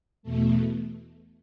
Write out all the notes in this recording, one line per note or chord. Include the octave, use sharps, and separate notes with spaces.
E2 B2 A3